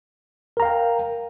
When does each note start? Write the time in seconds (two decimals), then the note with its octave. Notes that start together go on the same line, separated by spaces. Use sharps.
0.57 A#4
0.60 A#5
0.62 F5
0.65 G5